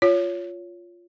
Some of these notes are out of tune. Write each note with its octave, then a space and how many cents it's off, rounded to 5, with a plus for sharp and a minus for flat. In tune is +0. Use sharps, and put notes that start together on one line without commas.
F4 +0 C#5 +15